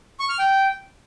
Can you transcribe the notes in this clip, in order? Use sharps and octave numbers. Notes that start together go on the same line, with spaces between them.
C#6
F6
G5